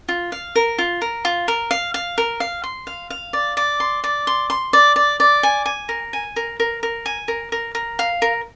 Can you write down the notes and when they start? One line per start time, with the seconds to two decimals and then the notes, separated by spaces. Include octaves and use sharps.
0.09 F4
0.32 F5
0.56 A#4
0.78 F4
1.02 A#4
1.25 F4
1.48 A#4
1.71 F5
1.94 F5
2.18 A#4
2.40 F5
2.64 C6
2.87 F5
3.10 F5
3.33 D5
3.57 D5
3.80 C6
4.04 D5
4.27 C6
4.50 C6
4.73 D5
4.96 D5
5.20 D5
5.43 G#5
5.66 G#5
5.89 A#4
6.13 G#5
6.36 A#4
6.60 A#4
6.83 A#4
7.06 G#5
7.28 A#4
7.52 A#4
7.75 A#4
7.99 F5
8.22 A#4